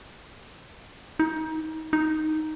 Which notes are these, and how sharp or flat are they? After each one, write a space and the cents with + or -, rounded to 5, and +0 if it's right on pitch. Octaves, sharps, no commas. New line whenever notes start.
D#4 +25
D#4 +0